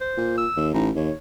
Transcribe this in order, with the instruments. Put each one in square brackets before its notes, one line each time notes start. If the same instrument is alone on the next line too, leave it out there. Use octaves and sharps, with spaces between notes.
[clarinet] C5
[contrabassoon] A#2
[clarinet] E6
[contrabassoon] D#2
[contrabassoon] A1 [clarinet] D#4
[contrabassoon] D#2 [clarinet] C#5